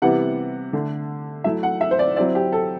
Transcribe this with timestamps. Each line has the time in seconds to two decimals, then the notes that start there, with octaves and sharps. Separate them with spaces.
0.02 C3 E3 G3 B3 E4 F#5
0.73 D3 A3 D4
1.44 F#3 A3 E4 E5
1.63 F#5
1.81 E5
1.91 C5
1.99 D5
2.16 F#3 C4 E4 D5
2.35 G4
2.52 A4